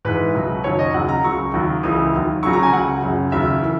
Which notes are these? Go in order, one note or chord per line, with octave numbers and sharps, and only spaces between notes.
G#2 E3 B4
C#2 B2 F#3
F#2 D#3 F#3 C#5
D#5
D#2 C#3 F#3 F#5
A#5
C#2 C#3 F#3 C#6
D#2 D#3 F#3
C#2 C#3 E3 D#6
D#2 D#3 F#3
C#2 C#3 F#3 C#6
A#5
G#5
C#2 C#3 F#3 F#5
F#2 C#3 F#3
D#2 C#3 F#3 E5
E3